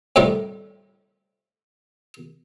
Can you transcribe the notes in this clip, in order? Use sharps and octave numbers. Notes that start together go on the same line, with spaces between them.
F2 A2 D#3 G3